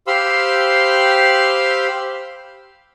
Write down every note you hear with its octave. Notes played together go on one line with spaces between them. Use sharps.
G4 C5 F5 B5 C6 E6